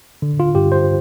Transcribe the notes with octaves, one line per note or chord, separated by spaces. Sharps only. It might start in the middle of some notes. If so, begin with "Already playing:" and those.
D3
F4
G2 G4
C5